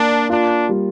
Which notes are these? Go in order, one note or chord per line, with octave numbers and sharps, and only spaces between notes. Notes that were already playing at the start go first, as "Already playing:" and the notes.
Already playing: A#3 D4
D4 F4
G3